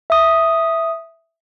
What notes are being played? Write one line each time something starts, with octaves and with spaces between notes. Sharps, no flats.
E5 D#6